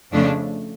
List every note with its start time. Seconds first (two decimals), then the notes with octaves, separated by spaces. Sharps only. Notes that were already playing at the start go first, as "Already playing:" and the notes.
0.12 F2 C#3 F3 A3 D4